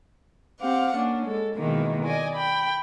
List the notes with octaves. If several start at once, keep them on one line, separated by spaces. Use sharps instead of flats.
C4 G4 F5 F#5
A#3 C#4 D4
G#3 A4
B2 D#3 E3 G#3 A#3
D5 D#5 G#5
G5 B5